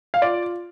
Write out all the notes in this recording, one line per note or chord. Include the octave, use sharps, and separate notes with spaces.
F5
F4 D5